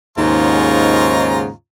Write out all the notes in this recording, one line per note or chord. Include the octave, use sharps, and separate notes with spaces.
D#2 G#2 C#3 F4 A#5 C#6